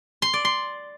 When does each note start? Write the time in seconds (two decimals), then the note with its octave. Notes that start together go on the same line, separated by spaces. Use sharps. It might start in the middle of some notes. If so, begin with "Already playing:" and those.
0.22 C6
0.33 D5
0.45 C6